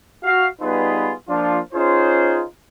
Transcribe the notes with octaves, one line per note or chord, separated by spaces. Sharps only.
F#4 F5
G3 B3 D#4 F4 G#4 B4
F3 A#3 D4 F4
C#4 D#4 F4 G#4 C5